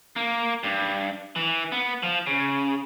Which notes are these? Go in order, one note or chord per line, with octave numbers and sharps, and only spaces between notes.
A#3
G2
E3
B3
F3
C#3